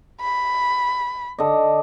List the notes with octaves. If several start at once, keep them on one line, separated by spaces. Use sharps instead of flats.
B5
D3 D#5